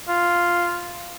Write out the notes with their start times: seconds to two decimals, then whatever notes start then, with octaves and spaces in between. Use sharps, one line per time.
0.08 F4